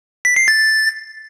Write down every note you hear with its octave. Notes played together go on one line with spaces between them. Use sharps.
B6
C7
A6